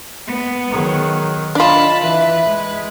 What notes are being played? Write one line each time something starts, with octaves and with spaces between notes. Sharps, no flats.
G#3 B3
D#3 F#3 G#4
D4 F4 D#5 A5 B5
E3 B4 E5
G#3